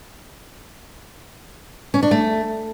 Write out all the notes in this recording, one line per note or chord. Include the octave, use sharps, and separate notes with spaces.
C#4
D4
A3